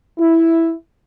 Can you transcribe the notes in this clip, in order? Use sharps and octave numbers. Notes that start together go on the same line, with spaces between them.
E4